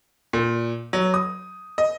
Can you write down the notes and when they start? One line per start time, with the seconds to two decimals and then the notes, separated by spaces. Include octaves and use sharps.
0.33 A#2
0.93 F#3
1.14 D#6
1.78 D#5